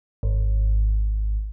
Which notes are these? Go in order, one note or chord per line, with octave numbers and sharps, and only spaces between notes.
G#1